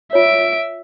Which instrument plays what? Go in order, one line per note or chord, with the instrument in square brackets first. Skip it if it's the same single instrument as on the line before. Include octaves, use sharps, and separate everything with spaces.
[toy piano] F4 C#5 [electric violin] E5 D7